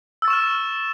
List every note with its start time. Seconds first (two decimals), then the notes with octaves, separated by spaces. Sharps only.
0.22 E6
0.25 A6
0.28 C#6
0.30 E7
0.33 F6